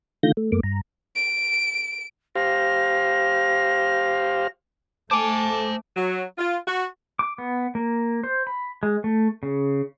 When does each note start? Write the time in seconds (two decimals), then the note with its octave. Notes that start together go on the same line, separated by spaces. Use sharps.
0.23 D3 D#3 A3 F4 G6 A#6
0.37 A3
0.52 F#2 A3 A#3 D6
0.63 G2 A#5
1.16 D7
2.35 G4 C5 F5 A#6
5.11 A3 C5 G#5 A5 D6
5.96 F#3
6.38 F4
6.67 F#4
7.19 D6
7.38 B3
7.75 A#3
8.24 C5
8.47 B5
8.83 G#3
9.04 A3
9.43 C#3